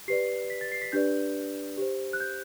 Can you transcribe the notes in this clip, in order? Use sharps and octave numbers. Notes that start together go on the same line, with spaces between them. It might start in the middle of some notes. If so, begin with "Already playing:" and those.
G4 B4 D5 C7
B6
A6
C7
B6
D4 G4 B4 D5 G6
G4 C5
F#6
G6